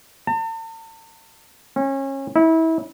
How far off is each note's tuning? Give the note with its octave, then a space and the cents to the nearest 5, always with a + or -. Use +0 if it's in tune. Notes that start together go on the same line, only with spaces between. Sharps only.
A5 +45
C#4 -30
E4 -30